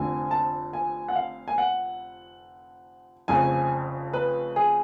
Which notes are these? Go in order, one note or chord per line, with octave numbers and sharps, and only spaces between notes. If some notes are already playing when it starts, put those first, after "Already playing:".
Already playing: F1 F2 D3 G#5
A5
G#5
F#5
F5
G#5
F#5
F1 F2 C#3 F3 G#5
B4
G#4